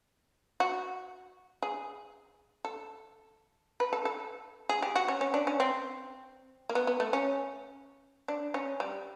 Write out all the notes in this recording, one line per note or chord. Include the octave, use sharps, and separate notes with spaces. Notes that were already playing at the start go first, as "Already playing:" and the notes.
F#4
G#4
A4
B4
A4
A4
G#4
G4
F#4
C#4
C#4
D4
C#4
C4
A#3
B3
B3
A3
C#4
D4
C#4
G3